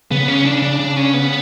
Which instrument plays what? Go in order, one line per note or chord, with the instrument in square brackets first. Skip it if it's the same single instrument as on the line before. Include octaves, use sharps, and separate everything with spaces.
[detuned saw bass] C#3 [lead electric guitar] B3
[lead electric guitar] C#4
D4
D4
D4
C#4
B3